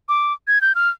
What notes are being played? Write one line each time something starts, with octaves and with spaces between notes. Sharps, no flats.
D6
G#6
G6
F6